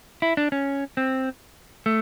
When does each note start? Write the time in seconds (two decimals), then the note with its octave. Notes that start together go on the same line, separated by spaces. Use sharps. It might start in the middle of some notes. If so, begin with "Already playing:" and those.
0.22 E4
0.37 D4
0.52 C#4
0.97 C4
1.86 A3